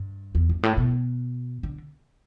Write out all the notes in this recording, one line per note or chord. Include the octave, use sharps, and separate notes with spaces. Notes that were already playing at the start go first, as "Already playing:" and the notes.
Already playing: G2
E2
G2
A2
B2
D3